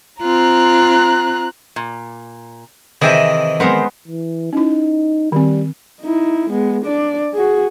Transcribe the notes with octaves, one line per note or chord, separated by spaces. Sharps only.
C4 F4 A#5 F#6
A#2
C3 D#3 E3 C4 G#4 D#5 E5
G#3 B3 C4 A#4 C5
E3
C#4 D#4 E4
D#3 G3 C4
D#4 E4
G#3 B3
D4 D5
F#4 G#4